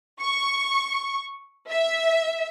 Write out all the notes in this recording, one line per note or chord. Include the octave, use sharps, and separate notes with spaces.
C#6
E5